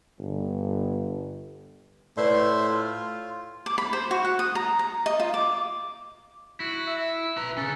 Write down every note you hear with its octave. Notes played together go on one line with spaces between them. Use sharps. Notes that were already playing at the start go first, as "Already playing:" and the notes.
G1
A2 B4 C5 D5 E5 C6
F4
D6
B5
C5
F#4
F#5
D#6
A#5
A#5
D#5
F4
D6
E4 F#4
E5
B4 A#5
C#4 G#4 A4